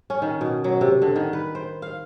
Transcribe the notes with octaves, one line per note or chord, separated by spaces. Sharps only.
C#4
D#3
B2
F#3
C3
D3
D#3
B4
C5
F5